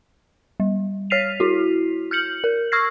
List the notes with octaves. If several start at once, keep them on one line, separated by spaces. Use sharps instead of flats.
G3
C#5 F6 B6 C7 D#7 F7
E4 F#4
F6 G6 C#7 F#7
A#4
C#6 E6 F6 G#6 A#6 C7